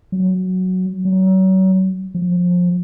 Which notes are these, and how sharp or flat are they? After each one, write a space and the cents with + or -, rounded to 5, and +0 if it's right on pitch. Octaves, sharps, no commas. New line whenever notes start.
F#3 +0
F#3 +35
F3 +25